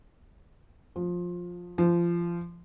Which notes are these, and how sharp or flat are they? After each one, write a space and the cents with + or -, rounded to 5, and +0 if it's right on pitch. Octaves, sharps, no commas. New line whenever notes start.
F3 +15
F3 -25